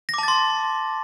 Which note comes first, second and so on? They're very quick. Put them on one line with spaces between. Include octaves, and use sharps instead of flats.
A#6 D6 A5 A6 C6